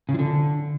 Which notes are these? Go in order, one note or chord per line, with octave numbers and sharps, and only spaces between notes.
C#3
F3
D3